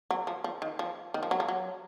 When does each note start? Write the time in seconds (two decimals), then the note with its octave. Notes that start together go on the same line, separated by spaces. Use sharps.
0.11 F#3
0.27 F3
0.44 F3
0.62 D#3
0.79 F3
1.14 D#3
1.23 F3
1.31 F#3
1.40 F3
1.48 F#3